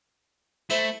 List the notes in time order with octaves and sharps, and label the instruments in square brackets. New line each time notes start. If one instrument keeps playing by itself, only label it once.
[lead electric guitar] A3 [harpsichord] E4 C5